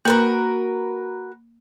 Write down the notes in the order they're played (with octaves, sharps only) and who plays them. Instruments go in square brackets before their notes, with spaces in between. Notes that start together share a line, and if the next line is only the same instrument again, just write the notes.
[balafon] A#3 [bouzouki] F#4 A#4 B4